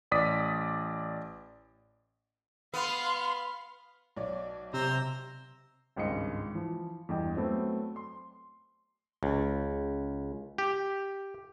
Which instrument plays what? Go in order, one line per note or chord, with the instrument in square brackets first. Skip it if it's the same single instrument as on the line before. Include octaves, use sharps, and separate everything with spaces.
[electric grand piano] A1 D5 D#6 B6
[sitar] B3 [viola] F5 C6
[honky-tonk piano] B1 C#5 D5
[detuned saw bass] C3 [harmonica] C5 [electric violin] A#5 E6
[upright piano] G#1 C#2 G2 D#5 C#7
E3 F3
E2 G2 D#5 G5
F#3 A3 B3 C4
C6
[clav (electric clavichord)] C#2
G4